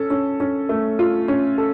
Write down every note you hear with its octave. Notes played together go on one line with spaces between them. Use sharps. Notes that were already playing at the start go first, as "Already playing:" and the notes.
Already playing: C#4 A4
C#4
C#4
A3
F4
C#4
A4